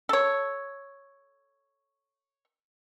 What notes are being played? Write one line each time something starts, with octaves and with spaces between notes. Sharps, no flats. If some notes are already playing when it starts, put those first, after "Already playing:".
A4 C#5